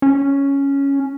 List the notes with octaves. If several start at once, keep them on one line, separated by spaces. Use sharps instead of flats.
C#4